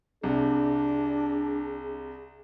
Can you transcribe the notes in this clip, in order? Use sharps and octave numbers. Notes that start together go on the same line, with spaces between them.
C2 C3 D4 G#4